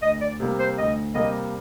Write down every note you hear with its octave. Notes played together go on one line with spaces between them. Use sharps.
D2 D#5
D5
C3 G3 A#3
C5
D2 D#5
C3 G3 A#3 D#5